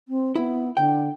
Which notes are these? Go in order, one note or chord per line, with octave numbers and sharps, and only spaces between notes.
C4
B3 E4
D3 G5